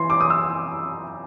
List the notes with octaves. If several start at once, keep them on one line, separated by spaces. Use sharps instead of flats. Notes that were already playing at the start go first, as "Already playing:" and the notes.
Already playing: E3 C6
D6
D#6
E6